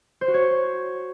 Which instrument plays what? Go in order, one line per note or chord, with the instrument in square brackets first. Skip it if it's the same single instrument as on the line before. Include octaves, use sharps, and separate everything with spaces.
[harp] C5
F#4
C#5